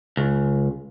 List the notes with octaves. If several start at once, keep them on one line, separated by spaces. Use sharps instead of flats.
C#2